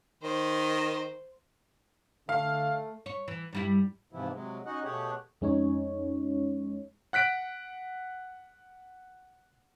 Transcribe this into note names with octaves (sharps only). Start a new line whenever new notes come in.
D#3 C5
D3 A3 F5
C#5
E3
G2 G3 E4
G#2 C3 E3 F3 B3 E4
C3 F#3 G#3
C#4 D#4 F#4 D#5 F#5
B2 A3 G4 G#4 C#5 F#5
F2 G#3 C#4 D#4 C#5
F#5 F#6 B6 D7